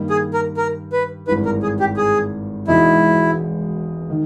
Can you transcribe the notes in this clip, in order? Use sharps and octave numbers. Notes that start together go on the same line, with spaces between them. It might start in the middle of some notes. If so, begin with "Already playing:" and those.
Already playing: G2 D#3 G3 A#3
G#4
A#4
A#4
B4
G#1 G2 E3 B4
A#4
G#4
G4
G#4
E1 E2 B2 G#3 D#4 E4
D#3